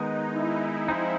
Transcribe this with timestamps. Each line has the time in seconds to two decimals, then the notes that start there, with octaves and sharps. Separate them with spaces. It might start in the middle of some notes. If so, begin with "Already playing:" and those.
Already playing: D#3 G#3 B3 D#4
0.33 E4
0.88 F3 G#3 C4 D#4